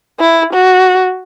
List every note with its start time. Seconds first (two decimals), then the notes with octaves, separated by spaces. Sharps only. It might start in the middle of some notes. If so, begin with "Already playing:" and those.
0.20 E4
0.53 F#4